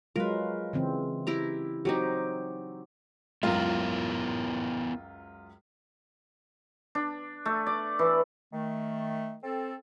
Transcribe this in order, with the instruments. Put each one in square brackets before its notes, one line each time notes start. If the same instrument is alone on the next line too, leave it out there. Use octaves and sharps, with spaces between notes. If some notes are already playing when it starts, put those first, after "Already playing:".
[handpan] F#3 G#3 F4 [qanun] A#4 B4
[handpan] C#3 E3 C4
[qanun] E4 G4 A#5
[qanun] F#3 C4 D#4 [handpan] G4
[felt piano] C#2 F#2 [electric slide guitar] B3 E4 A#4 [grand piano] F4
[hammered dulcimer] D4
A3
D5
E3
[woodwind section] D#3 A3
C4 A4